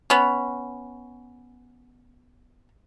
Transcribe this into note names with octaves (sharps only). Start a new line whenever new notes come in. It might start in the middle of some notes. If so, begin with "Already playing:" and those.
B3 C#4